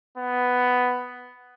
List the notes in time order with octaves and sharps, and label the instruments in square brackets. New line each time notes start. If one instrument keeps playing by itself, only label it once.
[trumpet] B3